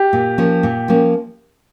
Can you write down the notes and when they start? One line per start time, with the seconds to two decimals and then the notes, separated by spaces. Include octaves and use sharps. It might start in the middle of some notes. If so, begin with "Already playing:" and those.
Already playing: G4
0.13 A#2
0.38 F3 A#3 C#4
0.63 A#2
0.88 F3 A#3 C#4